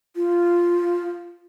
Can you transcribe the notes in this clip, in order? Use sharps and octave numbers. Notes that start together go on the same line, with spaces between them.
F4